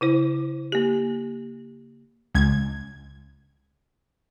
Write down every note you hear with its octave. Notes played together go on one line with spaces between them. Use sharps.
C#3 E4 C5
A#3 G4
C#2 G#6